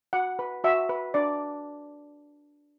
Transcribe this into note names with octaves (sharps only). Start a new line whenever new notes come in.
F#4 F#5
B4
F#4 E5
B4
D4 D5